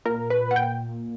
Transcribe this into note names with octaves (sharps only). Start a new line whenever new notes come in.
A#2 A#4
B4
F#5
G5